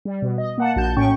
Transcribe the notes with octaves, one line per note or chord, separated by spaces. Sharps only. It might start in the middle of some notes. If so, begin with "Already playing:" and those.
G3
B2
D#5
A#3 F#5 A5
A#1 F#4 A5 G6
A2 C#4 G5 C#6